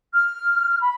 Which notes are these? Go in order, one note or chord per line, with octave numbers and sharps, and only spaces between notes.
F6
B5